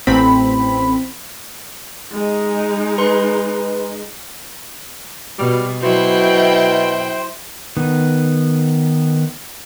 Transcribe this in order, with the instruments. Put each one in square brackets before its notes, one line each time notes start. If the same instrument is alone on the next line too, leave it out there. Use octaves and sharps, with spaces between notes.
[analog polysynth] A1 C4 B5
[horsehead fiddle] G#3 D#4
[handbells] B4 A#5 C6
[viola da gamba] B2 [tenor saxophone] G3 [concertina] F6
[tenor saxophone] B2 [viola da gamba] F#3 [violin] E4 G5 [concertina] C5
[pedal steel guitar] D#3 B3